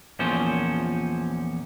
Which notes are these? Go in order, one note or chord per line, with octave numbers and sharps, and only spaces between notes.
E2 A#2 F3 C#4 C5